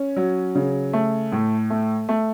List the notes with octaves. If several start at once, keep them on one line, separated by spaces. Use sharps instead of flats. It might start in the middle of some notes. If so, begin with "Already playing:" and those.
Already playing: C#4
F#3
C#3
A3
A2
A3
A3